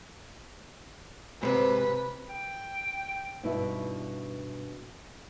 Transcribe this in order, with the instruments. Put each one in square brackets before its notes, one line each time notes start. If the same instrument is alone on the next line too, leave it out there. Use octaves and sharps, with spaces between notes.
[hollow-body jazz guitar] G#2 C3 [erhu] B4
[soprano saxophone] G5
[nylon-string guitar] G2 B2 B3 D#4 E4